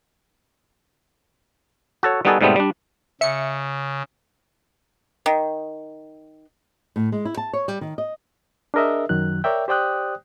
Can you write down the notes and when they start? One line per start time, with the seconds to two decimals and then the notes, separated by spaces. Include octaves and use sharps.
2.03 F#4 A4 C#5
2.25 G3 B3 D#4 F#4 G#4 A4
2.41 G#2 B2 G3 A3 B3 C4
2.56 G3 D4
3.21 C#3 E5 C#7
5.26 D#3
6.96 A2
7.12 G#3
7.25 E4
7.37 A5
7.53 C#5
7.68 G3
7.81 D#3
7.98 D#5
8.74 D4 G#4 A#4 D#5 E5
9.09 F#2 D#3 F#3 F#6
9.44 A#4 C#5 D5 E5 G5
9.68 G4 C5 D5 G5 D#6 F#6